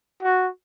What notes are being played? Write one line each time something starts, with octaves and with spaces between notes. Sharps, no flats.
F#4